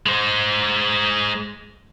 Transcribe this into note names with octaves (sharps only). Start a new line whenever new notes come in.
G#3 C5